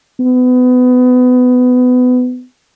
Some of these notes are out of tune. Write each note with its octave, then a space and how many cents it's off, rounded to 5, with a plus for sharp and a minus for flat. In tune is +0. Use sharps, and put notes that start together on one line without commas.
B3 +25